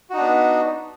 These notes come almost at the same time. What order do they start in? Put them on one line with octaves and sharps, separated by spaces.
F#4 D#4 D4 B3